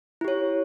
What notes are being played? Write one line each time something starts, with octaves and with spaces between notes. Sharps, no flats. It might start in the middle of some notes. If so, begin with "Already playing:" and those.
E4 G4 C#5